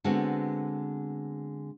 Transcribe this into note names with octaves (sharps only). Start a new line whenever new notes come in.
D3 G#3 B3 C4 F#4